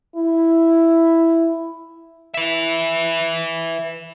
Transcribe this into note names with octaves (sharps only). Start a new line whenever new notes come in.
E4
B4 E5